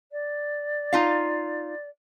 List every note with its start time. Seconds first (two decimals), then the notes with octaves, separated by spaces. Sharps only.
0.11 D5
0.93 D#4 F4 F5